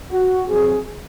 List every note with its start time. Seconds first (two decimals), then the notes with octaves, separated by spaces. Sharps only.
0.12 F#4
0.47 F2 C3 F#3 C4 G#4